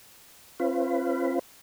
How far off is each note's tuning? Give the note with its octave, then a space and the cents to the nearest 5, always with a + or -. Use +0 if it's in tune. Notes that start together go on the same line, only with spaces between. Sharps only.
C4 +45 F4 -25 B4 +20